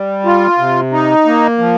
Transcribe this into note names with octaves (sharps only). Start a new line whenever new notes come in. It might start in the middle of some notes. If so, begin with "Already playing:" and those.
Already playing: G3
F4
C3
D#4
A#3
F3